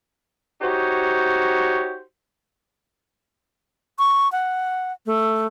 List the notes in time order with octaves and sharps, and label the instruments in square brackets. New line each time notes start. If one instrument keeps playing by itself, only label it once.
[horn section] D#4 F#4 G4 C5 C#5
[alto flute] C#6
F#5
A3